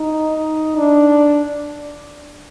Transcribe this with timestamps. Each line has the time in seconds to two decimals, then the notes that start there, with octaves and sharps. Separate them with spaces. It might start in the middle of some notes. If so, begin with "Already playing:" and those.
Already playing: D#4
0.77 D4